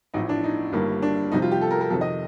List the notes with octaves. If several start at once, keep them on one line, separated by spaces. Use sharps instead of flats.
A1 A2 F3 D#4
D4
D#4
G1 G2 D#3 G3 A#3
D4
F2 C3 G3 D#4
F4
G4
A4
A#4
A#4
F2 C3 D#3 A4
D#5